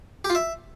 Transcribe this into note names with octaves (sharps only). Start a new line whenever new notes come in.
G4
F4
E5